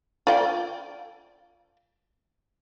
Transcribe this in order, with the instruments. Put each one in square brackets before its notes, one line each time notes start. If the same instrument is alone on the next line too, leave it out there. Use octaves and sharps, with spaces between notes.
[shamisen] F4 D5 G5